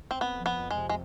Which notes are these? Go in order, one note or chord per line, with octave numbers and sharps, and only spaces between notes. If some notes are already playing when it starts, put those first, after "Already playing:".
C4
F2 B3
F3
B3
F2
G#3
C3
G#3